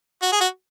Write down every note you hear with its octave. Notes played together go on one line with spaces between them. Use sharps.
F#4
G#4
F#4